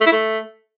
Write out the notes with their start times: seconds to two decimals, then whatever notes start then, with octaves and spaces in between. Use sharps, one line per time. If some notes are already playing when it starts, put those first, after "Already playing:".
0.01 A3
0.06 E4
0.12 A3